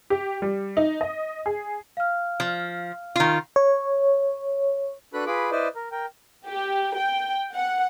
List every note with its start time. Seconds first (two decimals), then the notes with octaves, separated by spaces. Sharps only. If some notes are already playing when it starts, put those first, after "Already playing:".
0.10 G4
0.42 G3
0.77 D#4
1.01 D#5
1.46 G#4
1.97 F5 F6
2.40 F3
3.16 D#3 F4
3.56 C#5
5.14 D4 F#4 A4 B4 B5 F#6
5.26 F4 G#4 B4 B5 D6
5.52 E4 B4 C5 D5 D#5
5.75 A#4
5.91 A#4 G5
6.45 G4
6.96 G5
7.54 F#5